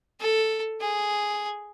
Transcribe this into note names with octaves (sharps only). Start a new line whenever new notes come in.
A4
G#4